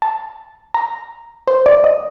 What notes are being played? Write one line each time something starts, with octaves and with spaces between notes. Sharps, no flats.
A5
A#5
C5
D5
D#5